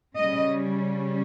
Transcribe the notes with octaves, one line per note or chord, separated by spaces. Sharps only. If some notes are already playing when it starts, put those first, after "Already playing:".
C#3 G3 C#4 D#5